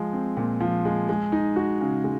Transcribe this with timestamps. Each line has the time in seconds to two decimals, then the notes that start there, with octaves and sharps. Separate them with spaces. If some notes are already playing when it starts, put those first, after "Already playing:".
Already playing: F3 G#3
0.13 C4
0.37 A#2
0.60 F3
0.85 G#3
1.09 G#3
1.32 D#4
1.56 F#4
1.81 C#3
2.04 G#3